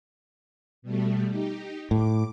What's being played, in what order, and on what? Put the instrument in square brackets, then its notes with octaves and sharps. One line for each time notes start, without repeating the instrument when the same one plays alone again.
[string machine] B2 G3 A3
D#4 G4
[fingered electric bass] A2 [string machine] D6